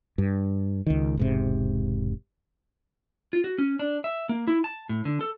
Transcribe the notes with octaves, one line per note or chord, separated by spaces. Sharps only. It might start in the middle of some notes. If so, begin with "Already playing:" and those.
G2
C#2 D#3
E1 G#2 C3
F4
F#4
C#4
D4
E5
A#3
E4
A5
A2
D3
A4